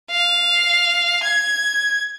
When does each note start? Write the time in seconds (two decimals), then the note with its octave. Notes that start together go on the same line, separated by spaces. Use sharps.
0.11 F5
1.24 G#6